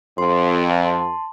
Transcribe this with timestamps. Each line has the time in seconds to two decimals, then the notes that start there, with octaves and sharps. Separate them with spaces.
0.18 F2 C6
0.84 A5 C6